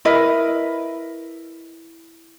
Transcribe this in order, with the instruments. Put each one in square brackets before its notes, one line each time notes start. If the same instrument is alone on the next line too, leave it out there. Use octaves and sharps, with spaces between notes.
[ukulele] E4 A#4 B4 D#5